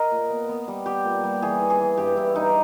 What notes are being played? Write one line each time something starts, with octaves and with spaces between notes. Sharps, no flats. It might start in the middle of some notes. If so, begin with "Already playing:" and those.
Already playing: A#4 D#5
A#2
B3
B3
G3
B3 G4
A#2
G3
E3 G#4
E3
G#4
E3
G2 G4
G2 E4
G2 D#4